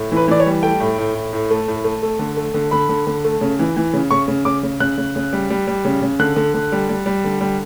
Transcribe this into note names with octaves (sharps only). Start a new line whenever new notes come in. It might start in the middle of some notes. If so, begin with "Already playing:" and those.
Already playing: A2
E3 B4
E3 D5
C#5
G3
A3 G5
A2
A2
A2
A2
A3
A2
A3
A3
D3
A3
D3
D3 B5
D3
D3
A3
C#3
E3
E3
C#3
C#3 C#6
C#3
C#3 D6
C#3
C#3 F#6
C#3
C#3
G3
G3
G3
C#3
C#3
D3 F#6
D3
D3
G3
G3
G3
D3
G3